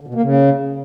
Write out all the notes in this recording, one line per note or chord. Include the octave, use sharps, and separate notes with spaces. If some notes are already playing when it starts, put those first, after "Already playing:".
D3
B2
A#3
C#3